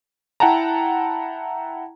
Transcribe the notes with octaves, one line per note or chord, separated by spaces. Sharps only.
E4 F#5 G5 A5 A#5